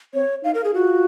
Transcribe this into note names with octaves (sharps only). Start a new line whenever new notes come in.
C4 C#5
D#4 F5
A#4
G#4
F4 F#4